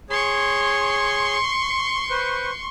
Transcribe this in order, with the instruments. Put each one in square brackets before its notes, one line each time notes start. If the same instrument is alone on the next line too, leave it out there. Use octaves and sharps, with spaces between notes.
[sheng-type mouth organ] G#4 C#5 [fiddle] C6 C#6
[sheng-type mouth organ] B4 C5